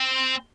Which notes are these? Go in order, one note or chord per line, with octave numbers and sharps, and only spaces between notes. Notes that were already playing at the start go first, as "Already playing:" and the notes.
Already playing: C4